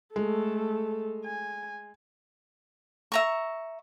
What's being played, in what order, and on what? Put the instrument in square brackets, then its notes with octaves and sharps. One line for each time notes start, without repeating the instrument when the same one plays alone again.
[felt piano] G#3 [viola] A3 A4
[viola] G#5
[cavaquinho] E5 A#5 C#6